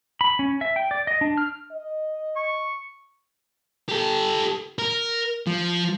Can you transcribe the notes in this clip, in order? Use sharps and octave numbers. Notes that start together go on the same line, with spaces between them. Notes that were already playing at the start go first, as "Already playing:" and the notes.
B5
C#4
E5
G5
D5
D#5
D4
F6
D#5
C#6
G4 A4
A#4
F3